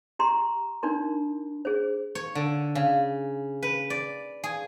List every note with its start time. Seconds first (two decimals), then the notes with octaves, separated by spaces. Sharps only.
0.19 G4 A#5 C6
0.83 D4 D#4 A#4 C6
1.65 G#4 C5
2.15 C#5
2.35 D3
2.75 C#3
3.63 B4
3.90 D5
4.44 G#4